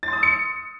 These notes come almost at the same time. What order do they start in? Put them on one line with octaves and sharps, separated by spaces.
A6 C6 D#6 E6 C#7